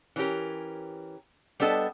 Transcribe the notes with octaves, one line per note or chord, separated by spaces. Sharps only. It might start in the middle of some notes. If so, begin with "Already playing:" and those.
E3 B3 C#4 G4 A#4
G3 B3 D4 A4 D#5